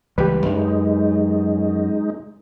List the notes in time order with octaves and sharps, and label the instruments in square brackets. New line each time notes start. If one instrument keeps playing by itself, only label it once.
[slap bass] C#2 E3 G3 [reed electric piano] G4 B4
[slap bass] F#2 [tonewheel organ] G#3 D#4